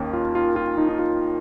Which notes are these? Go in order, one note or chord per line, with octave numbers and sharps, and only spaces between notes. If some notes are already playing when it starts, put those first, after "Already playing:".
Already playing: D#2 D#3 A#3 C#4
F4
F4
F4
D#4
D#4
F4